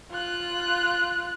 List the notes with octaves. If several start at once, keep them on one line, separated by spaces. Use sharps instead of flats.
F4 F#6